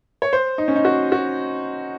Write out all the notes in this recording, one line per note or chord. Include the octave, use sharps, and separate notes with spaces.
C#5
C5
D#4
C#4
D#4
F#4
F#4